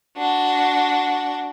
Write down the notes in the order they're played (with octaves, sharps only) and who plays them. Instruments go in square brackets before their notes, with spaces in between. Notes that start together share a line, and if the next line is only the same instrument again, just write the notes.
[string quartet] D4 F#4